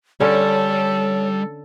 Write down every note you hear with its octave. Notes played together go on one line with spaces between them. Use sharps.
D3 G3 C#4 A4 C#5